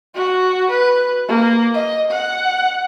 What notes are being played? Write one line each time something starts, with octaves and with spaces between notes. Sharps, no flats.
F#4
B4
A#3
D#5
F#5